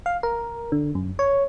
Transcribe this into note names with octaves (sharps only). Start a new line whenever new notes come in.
F5
A#4
D3
F#2
C#5